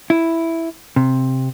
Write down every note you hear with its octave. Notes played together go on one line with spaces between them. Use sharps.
E4
C3